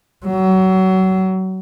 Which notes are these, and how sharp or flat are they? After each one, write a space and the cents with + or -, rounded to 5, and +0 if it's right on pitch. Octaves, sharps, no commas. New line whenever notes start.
F#3 +30